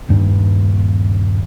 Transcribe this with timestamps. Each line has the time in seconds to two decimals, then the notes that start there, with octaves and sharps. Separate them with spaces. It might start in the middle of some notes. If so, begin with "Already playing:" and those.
0.08 D#1 G2